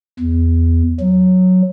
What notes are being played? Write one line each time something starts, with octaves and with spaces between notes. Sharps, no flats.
E2
F#3